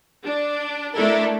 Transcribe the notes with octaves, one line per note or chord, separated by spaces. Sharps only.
D4
A3 D4 E4 A4 A#4